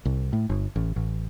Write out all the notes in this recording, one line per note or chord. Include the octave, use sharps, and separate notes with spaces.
C2
A2
G1
A1
A1